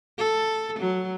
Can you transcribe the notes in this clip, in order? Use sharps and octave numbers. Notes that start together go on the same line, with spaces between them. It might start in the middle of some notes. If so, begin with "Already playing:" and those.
A4
F#3